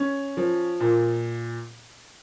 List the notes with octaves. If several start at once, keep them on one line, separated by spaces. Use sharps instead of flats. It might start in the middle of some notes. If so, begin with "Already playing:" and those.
Already playing: C#4
F3
A#2